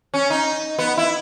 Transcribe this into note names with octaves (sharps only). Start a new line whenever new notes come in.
C#4
D#4
B3
E4